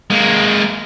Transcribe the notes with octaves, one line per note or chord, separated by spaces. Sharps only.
G#3 A#3